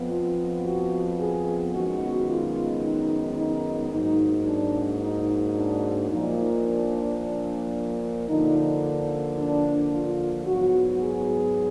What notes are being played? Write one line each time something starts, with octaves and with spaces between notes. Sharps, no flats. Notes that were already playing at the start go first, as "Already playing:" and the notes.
Already playing: F2 F3 B3
F4
F#4
G#4
F#2 D#3 G#3 B3 F#4
F4
D#4
D#4
G#2 F#3 A#3 D#4
D4
D#4
D4
A#2 F3 A#3 D#4
D4
D3 F3 A#3 D#4
D4
F4
G#2 F#3 B3 F#4
G#4